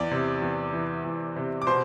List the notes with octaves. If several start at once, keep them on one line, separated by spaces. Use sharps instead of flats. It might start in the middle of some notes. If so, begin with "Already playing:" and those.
Already playing: E2 D5
C3
E2
E3
E2
C3
D6
B2 C5 C6